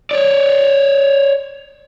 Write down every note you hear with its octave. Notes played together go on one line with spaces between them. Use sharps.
C#5 D5